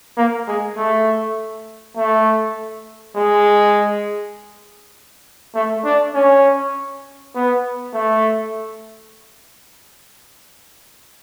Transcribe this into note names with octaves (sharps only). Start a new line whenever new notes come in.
A#3
G#3
A3
A3
G#3
A3
D4
C#4
B3
A3